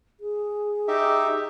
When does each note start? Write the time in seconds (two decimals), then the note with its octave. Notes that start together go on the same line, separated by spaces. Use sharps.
0.20 G#4
0.88 D#4 G4 E5